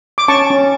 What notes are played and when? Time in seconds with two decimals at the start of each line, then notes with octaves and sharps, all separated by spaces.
0.18 D6
0.28 C#4 A5 C#6
0.50 C#4